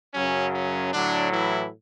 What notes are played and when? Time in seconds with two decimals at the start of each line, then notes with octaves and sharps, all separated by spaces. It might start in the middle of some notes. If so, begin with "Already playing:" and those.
0.14 F#2 C#3 F#3 C#4
0.54 C#4
0.93 A2 D3 F#3 D4
1.32 E3 E4